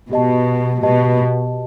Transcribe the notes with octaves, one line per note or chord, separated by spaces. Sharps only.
B2 G4 D#5 A5
B2 G4 D#5 A5